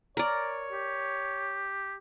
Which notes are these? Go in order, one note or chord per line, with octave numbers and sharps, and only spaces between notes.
A#4 C#5 D5
G4